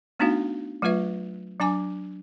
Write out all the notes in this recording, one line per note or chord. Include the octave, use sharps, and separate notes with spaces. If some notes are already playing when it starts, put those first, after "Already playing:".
A3 B3 D4 D#4 F#4 F5
F#3 A3 F4 B4 E5
F#3 D4 G#5 D6